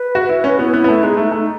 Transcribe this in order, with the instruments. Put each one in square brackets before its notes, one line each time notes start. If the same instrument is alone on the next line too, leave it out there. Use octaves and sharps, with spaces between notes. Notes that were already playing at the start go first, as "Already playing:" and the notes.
Already playing: [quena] B4
[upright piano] F#4
E4
C#4
[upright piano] B3 [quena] E4
[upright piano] B3
B3
A3
[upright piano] G#3 [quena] D#4
[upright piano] A3
A3